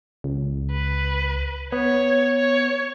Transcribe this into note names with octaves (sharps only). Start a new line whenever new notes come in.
C#2
B4
B3 C#5
C#5